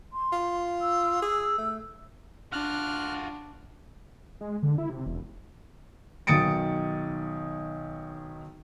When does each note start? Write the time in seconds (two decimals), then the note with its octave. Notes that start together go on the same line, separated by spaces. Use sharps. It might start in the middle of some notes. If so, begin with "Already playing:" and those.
0.13 C6
0.33 F4
0.82 E6
1.22 G#4
1.59 A3
2.52 D4 F4 F#4 F6 F#6
4.41 G#3
4.63 D3
4.78 E4
4.90 C3
5.06 E1
6.27 B1 D#3 D#6 A6 C#7 D7